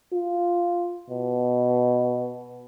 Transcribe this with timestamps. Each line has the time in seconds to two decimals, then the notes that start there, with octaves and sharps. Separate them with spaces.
0.13 F4
1.10 B2